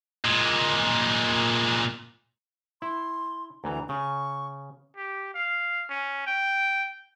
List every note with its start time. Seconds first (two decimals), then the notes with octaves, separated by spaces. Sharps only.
0.25 A#2 G#3
2.82 E4 C6
3.64 D2 E3 A#5
3.89 C#3 C#6
4.96 G4
5.34 F5
5.90 C#4
6.26 G5